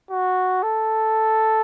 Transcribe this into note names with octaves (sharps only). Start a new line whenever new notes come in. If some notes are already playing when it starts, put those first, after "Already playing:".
F#4
A4